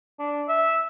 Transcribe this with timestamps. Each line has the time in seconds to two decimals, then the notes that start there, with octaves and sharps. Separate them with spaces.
0.19 D4
0.48 E5